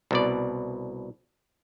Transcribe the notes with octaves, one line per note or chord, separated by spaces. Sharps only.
C2 B2 D5